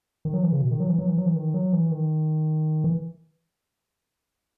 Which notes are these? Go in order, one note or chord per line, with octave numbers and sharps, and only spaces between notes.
D#3
F#3
E3
C#3
B2
D#3
F#3
E3
F#3
E3
F#3
E3
D#3
F#3
E3
D#3
E3